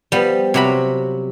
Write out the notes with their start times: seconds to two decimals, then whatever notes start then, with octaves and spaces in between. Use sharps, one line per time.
0.12 F3 G3 B3
0.54 C3 F#3 B5